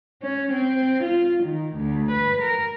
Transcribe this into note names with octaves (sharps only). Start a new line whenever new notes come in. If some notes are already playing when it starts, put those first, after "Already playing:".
C#4
C4
F4
D#3
D2
B4
A#4